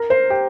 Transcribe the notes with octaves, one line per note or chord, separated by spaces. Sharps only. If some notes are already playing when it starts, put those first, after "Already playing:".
Already playing: A#4
C5
G4